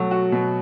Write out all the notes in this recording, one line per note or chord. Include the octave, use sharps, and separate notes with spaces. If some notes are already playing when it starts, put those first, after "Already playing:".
Already playing: B2 F#3 A3 A4
F#4
B2